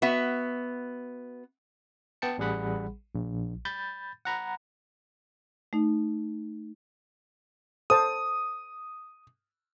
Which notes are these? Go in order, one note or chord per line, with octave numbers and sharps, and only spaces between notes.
B3 F#4 E5
B3 G5 A5 C#7
A1 G3 G#4 F#5 B5
A#1
B5 G6 A6
F#5 A#5 B5
A3 D#4
A4 C5 A5 D#6